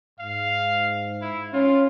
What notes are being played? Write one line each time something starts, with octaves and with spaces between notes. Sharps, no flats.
G#2 F5
E4
C#4 F4